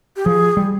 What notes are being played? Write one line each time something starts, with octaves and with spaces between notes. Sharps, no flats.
G4
F3 G#4
G3